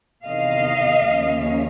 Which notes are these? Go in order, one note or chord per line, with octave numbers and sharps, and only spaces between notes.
E2 C3 D#3 D#5 F5
D#2 C#3 F3 A#3 C#4